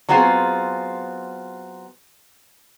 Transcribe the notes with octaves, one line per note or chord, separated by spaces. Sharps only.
F#3 B3 C4 F4 G#4